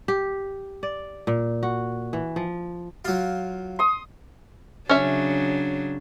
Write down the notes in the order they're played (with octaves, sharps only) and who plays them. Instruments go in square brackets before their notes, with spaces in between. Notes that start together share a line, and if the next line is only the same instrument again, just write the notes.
[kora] G4
D5
A#2
F#4
E3
F3
[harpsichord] F#3 F4
[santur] C6 D#6
[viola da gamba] C#3 F#3 D4 [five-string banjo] C#4 E5